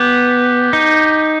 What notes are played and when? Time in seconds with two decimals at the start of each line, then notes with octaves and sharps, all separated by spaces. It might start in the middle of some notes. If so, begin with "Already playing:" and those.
Already playing: B3 G4
0.73 D#4